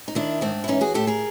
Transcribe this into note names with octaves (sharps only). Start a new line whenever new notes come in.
D#4
D#3 D4 E4
G#2 C4 D4
E4
E3 C#4 D#4
F#4 G#4
A2 G4 A4
G#4 A#4